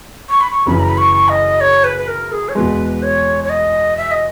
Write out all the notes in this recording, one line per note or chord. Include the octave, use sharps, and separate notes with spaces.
C#6
B5
C#6
F#1 F#2 C#3 E3 B5
A#5
B5
C#6
D#5
C#5
B4
B4
A#4
G#4
C#5
E2 B2 G#3 B4
C#5
C#5
D#5
E5
D#5